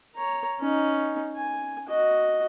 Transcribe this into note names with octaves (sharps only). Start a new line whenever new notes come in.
C#5 A#5
C#4 D#4
G#5
F#4 D#5